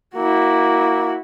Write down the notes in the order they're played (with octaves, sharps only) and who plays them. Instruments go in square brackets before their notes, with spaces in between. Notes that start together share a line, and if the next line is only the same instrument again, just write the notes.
[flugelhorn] A#3 [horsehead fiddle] E4 F#4